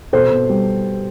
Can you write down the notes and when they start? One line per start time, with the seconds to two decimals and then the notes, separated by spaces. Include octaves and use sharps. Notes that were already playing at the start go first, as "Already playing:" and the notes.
0.13 B2 A4 C5
0.31 B2
0.49 G3